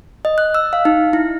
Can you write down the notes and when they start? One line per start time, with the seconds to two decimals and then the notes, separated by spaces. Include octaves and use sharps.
0.25 D#5
0.38 F#6
0.54 E6
0.73 F5
0.85 D#4
1.13 E4